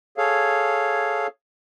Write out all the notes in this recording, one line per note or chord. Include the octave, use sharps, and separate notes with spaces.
G#4 A4 C#5 F5